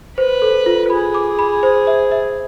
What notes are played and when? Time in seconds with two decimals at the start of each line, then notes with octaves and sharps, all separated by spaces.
0.18 B4 C5
0.42 A4
0.66 F4
0.90 G#4 B5
1.14 D6
1.39 B5
1.63 C5
1.87 E5
2.11 E5